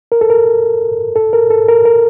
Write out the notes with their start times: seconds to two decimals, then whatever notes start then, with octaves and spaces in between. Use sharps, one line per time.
0.12 A#4
0.21 A4
0.30 A#4
1.16 A4
1.33 A#4
1.50 A4
1.68 A#4
1.85 A#4